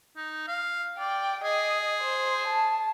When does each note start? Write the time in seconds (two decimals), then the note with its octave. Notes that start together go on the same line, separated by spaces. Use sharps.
0.16 D#4
0.47 F5
0.99 D5 G5
1.44 G#4 D#5
2.01 C5
2.47 A5